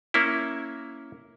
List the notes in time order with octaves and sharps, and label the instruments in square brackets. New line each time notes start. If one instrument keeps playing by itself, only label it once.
[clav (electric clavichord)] A#3 C#4 E4